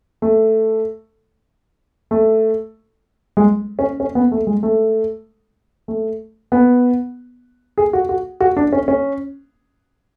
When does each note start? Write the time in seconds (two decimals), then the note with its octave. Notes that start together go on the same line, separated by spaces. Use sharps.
0.22 A3
2.11 A3
3.37 G#3
3.79 C#4
4.00 C#4
4.15 B3
4.32 A3
4.47 G#3
4.63 A3
5.88 A3
6.52 B3
7.78 G#4
7.93 F#4
8.09 F#4
8.40 F#4
8.57 D4
8.73 C#4
8.88 C#4